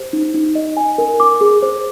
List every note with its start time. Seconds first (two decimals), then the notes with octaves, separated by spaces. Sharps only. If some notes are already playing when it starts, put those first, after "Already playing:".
Already playing: G4 C5
0.13 D#4
0.34 D#4
0.55 D#5
0.77 G#5
0.98 A#4
1.20 D6
1.41 G#4
1.62 C5